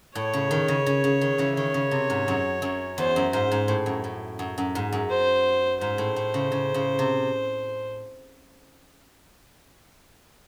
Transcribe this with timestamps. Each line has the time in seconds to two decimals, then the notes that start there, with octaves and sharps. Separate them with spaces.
0.15 A2 C#5
0.33 C#3
0.51 D#3
0.68 C#3
0.86 C#3
1.04 C#3
1.21 D#3
1.38 C#3 E3
1.56 D#3 C#5
1.74 C#3
1.91 C3
2.10 G#2
2.28 F#2
2.62 F#2
2.98 E2 C5
3.16 F#2
3.33 G#2 C5
3.51 G#2
3.68 A2
3.86 F#2
4.04 A2
4.39 F#2
4.58 F#2
4.75 G#2
4.93 F#2
5.10 C5
5.81 G#2 C5
5.98 A2
6.16 A2
6.34 C#3
6.52 C#3
6.74 C#3
6.99 C3